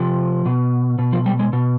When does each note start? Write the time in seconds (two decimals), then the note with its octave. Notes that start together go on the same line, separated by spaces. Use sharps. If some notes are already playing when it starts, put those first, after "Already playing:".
Already playing: C3 F3
0.46 B2
0.99 B2
1.12 F3
1.26 G3
1.39 G#3
1.53 B2